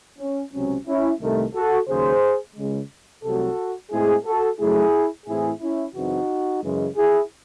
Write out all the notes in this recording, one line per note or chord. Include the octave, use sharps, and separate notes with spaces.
C#4
C#2 C3 F#3 C4 C#4
C#4 E4
C2 C3 D#3 A3
F#4 A4
D#2 C#3 F#3 G#4 C5
C#2 C#3 G#3
C2 C3 F#3 A3 C4 F#4 A4
A2 G#3 C4 E4 G#4
F#4 A4
F#2 C#3 F#3 A3 E4 G#4
A2 E3 C4 E4 G#4
C#4 E4
F#2 C#3 E3 C4 D#4 F#4
F#2 C#3 E3 G#3
E4 G#4